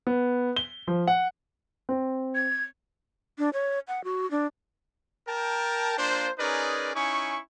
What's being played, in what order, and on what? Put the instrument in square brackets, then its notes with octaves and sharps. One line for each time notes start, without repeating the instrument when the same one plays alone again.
[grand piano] B3
G7
F3
F#5
C4
[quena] G#6
[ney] D4
C#5
F#5
F#4
D4
[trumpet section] A#4 G5 A5
A#3 D4 F4 C5
C#4 D#4 G#4 A#4 B4 D5
C#4 D#4 E4 G#5 C#6